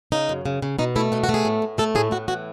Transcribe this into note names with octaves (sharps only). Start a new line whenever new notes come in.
C#3 D#4
F#2
C#3
C#3
B2 D#4
A3 E4
B2 D#4
F#4
A3
G#4
A2
A2
A3 A4
A2 G#4
A2 F#4
E3 F#4